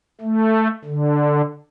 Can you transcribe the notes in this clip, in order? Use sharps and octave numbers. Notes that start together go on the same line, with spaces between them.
A3
D3